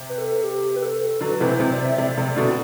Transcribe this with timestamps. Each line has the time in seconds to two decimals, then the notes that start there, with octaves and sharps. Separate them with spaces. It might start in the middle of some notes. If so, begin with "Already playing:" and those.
Already playing: C3
0.09 B4
0.18 A4
0.44 G4
0.76 B4
0.82 A4
1.20 D3 F#3 B4
1.40 C3 E3 B4
1.47 C5
1.60 C3
1.73 D5
1.85 E5
1.97 C3 D5
2.18 C3
2.36 B2 D3